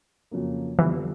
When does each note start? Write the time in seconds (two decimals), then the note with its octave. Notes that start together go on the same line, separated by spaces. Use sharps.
0.31 F2 C#3 F#3 A#3
0.79 F2 D3 E3 G3 B3